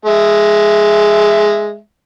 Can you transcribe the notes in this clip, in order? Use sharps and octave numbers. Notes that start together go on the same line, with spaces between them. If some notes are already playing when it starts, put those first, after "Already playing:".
G#3 E5